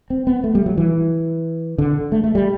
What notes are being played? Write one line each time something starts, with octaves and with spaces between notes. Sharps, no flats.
C4
B3
A3
G3
F#3
E3
D3
A3
A3
G3